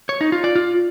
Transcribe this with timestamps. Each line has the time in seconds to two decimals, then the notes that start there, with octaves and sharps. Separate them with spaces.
0.09 C#5
0.21 D#4
0.32 F4
0.44 D5
0.55 F4